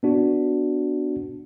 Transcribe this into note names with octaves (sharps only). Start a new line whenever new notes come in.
B3 D4 F#4